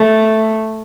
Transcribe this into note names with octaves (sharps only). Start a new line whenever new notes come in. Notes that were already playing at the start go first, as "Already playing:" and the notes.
Already playing: A3